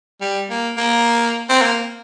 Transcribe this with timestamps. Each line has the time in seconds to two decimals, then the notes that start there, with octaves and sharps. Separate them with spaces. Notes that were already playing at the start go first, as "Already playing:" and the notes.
0.21 G3
0.50 A#3
0.77 A#3
1.49 C4
1.62 A#3